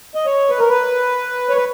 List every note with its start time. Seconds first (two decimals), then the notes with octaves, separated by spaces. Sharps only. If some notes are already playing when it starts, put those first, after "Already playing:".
0.15 D#5
0.26 C#5
0.50 B4
0.59 A#4
0.69 B4
1.49 C#5
1.57 B4